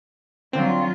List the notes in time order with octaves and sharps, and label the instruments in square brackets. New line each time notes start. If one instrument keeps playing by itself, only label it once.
[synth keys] D3 C4 [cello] F#3 F4